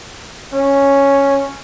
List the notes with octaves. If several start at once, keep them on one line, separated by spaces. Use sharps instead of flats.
C#4